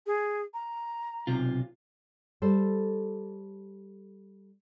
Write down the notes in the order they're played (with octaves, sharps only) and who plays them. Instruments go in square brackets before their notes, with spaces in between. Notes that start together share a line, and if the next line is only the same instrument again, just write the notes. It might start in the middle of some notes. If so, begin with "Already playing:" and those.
[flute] G#4
A#5
[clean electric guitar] B1 C3 F4
[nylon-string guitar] G3 A4 C5